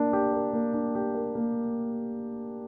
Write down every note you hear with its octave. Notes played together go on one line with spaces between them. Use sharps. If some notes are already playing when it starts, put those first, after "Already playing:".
Already playing: A#3 D4
G4
A#4
A#3
D4
G4
A#4
A#3